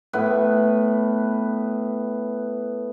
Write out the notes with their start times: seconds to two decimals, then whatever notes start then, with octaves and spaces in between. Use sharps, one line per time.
0.13 A2 B3 B4